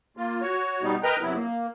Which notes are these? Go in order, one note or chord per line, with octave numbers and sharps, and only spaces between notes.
A#3 F4
F#4 C#5
B2 G3 B3 D#4
A#4 B4 D#5 G5 A#5
F#2 C3 F#3 B3 E4
A#3